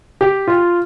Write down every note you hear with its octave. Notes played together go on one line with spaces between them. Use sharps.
G4
F4